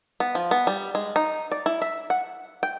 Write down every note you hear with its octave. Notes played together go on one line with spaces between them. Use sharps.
B3
F3
B3
G3
G#3
D#4
D5
E4
E5
F#5
G5